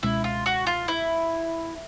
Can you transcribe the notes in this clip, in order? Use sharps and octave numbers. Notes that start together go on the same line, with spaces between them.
C#2 B2 G#3 C#4 E4
F4
F#4
F4
E4